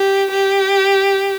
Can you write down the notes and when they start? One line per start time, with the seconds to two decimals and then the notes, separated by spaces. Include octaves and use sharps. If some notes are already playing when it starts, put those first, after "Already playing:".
Already playing: G4
0.30 G4